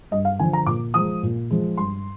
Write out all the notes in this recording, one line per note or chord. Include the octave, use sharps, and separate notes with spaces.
G2 D#5
F5
D3 F3 G#5
A#5
A#2 D6
F3 G#3 D#6
A#2
F3 G#3
G2 C6